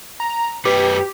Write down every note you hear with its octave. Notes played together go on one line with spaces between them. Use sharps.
A#5
F#2 F#4 G4 B4